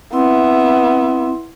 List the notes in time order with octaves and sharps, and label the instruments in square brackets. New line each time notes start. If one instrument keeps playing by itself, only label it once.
[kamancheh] B3 E5 [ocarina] C4 [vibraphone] E4 C6